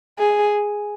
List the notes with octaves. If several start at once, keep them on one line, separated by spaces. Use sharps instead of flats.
G#4